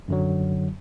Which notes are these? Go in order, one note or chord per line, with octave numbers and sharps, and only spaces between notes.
F#2 D3 F#3